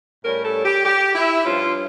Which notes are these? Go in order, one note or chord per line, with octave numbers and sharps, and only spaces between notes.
A2 G3 C#4 A#4
A4
G4
G4
E4
G2 F3 C#4 F4